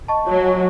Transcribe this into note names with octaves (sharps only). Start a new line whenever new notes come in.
D#5 A5 C#6
F#3 C#5
G#5 C#6